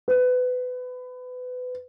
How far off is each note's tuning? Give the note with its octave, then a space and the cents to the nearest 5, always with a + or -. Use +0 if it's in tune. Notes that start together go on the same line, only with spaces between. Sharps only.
B4 +25